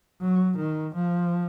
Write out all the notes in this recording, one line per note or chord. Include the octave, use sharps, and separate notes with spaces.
F#3
D#3
F3